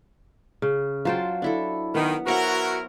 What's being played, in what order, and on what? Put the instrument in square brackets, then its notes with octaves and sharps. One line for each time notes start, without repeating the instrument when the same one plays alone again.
[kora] C#3
[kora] F#3 C5 G5 [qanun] F4 A5
[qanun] D4 E4 A4
[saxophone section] D#3 [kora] B3
[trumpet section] E4 A#4 [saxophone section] F#4 [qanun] C5 C#5 F#5